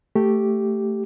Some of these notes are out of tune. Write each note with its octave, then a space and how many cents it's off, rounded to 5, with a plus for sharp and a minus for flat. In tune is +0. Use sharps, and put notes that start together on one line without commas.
A3 +10 G4 -5